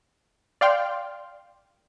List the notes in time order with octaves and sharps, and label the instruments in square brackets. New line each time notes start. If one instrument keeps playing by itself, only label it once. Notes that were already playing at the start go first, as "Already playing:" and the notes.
[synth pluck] D5 F5 G5 C6 F6